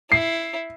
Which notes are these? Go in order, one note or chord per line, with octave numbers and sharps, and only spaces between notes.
E4 C7